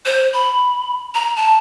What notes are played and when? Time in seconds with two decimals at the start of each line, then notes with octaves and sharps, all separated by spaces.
0.06 C5
0.33 B5
1.15 A#5
1.36 A5